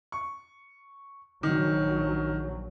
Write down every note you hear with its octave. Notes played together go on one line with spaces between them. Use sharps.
C#6
A#1 D#3 F#3